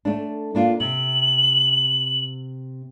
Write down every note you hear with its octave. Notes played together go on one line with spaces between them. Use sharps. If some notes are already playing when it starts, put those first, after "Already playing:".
A3 D4
A#3 D4 F4
C3 F#7